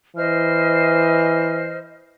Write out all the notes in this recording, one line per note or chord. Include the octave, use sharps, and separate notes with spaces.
E3 C5 D#5 F6